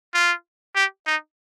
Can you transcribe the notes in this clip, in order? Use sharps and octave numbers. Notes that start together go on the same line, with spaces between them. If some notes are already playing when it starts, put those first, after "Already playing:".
F4
G4
D#4